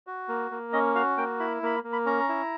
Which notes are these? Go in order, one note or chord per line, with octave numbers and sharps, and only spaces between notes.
F#4
A#3
A#3
C#4 D#5
F#4 F5
A#3 G5
E4 B5
A#3 B5
A#3
B5
C#4 A#5
E4